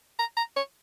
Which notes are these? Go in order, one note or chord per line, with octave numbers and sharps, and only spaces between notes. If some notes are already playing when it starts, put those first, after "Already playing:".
A#5
A#5
C#5